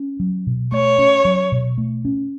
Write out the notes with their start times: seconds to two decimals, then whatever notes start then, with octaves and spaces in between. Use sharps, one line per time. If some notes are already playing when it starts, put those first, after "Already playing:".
Already playing: C#4
0.20 F#3
0.47 B2
0.72 A3 C#5
0.98 C#4
1.25 F#3
1.52 B2
1.78 A3
2.05 C#4